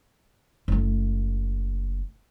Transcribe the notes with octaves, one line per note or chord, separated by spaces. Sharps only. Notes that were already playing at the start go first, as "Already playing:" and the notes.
F#1 A3